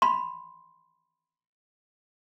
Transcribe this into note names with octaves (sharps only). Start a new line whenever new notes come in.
B5 C6